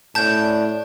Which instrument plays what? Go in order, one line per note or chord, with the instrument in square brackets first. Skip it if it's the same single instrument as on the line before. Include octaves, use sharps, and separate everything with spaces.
[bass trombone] A2 [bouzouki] C#4 D4 [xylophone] A5 G6